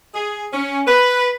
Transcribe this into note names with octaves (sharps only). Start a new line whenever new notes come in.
G#4
C#4
B4